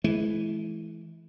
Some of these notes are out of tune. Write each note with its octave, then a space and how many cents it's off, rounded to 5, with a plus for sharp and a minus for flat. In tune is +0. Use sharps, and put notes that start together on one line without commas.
E3 +0 G#3 +45